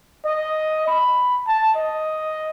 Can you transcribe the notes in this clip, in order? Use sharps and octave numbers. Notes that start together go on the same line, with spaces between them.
D#5
B5
A5
D#5